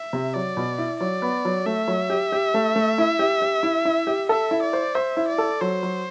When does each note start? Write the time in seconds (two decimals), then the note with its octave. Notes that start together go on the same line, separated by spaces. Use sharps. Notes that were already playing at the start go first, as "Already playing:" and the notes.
Already playing: E5
0.13 C3
0.34 F#3 D5
0.57 B2
0.78 E4
1.00 F#3 D5
1.22 B3
1.45 F#3
1.66 A3 E5
1.88 F#3
2.10 G4
2.32 G4
2.54 A3
2.76 A3
2.98 E4
3.19 G4
3.42 G4
3.63 E4
3.85 E4
4.07 G4
4.29 A4 E5
4.51 E4
4.63 D5
4.73 C5
4.95 C5 E5
5.17 E4
5.28 D5
5.38 A4
5.61 F#3 C5
5.83 F#3